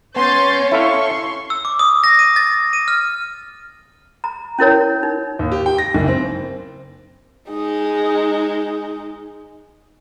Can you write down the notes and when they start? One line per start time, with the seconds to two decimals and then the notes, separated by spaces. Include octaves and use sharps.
0.16 B3 C#4 C#5 C6 G6 A6
0.72 E4 A4 F5 C6 C#6
1.50 E6
1.65 D6
1.79 D#6
2.04 A#6
2.19 D#7
2.36 A6
2.73 D#7
2.88 F6
4.24 A#5
4.59 C#4 E4 A#4 C#5
5.03 D#4
5.39 D#2
5.52 G4
5.66 G5
5.78 A#6
5.95 F#1
6.08 C4
7.49 G#3 D#4